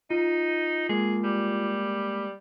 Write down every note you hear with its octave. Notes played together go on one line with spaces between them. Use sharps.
D#4 F4
G#3 A#3 G#4
G3